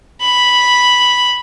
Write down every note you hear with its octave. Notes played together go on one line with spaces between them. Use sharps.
B5